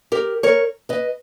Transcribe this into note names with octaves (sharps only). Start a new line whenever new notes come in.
G4 A#4
A#4 C#5
B4 D#5